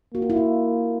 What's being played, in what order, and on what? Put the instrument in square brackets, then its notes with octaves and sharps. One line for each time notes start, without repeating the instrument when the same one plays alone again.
[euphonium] A#3 [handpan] F#4
[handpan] F4
E4
F4